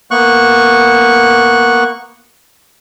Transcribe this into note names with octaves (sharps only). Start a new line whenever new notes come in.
A#3 B3 C#6 F#6